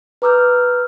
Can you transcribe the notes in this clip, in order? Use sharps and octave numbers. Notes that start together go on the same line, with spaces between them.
B4 A#5 D6 E6 F6 G6